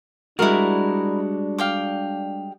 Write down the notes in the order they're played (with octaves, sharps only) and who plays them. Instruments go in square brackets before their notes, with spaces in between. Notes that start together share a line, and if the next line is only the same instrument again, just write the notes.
[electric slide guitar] G3 G#3 F#4 [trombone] D4 [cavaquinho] E4 A#4
[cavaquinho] F5 G5 D6